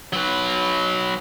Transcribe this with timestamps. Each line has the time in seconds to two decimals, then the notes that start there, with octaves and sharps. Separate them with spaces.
0.13 F#3 B4